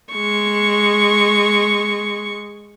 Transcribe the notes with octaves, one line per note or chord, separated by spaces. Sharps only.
G#3 C#6